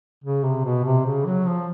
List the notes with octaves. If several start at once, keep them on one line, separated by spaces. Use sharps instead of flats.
C#3
C3
B2
C3
C#3
F#3
F3